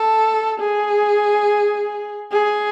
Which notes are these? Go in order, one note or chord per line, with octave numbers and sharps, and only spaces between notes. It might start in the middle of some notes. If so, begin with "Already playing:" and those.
Already playing: A4
G#4
G#4